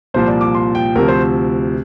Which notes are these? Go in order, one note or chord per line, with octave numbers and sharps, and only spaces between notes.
C2 A#2 F3 C5
D5
D6
C6
G5
D2 C3 F3 A#4
C5